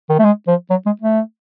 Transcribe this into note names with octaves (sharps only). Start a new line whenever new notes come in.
D#3
A3
G#3
F3
F#3
G#3
A3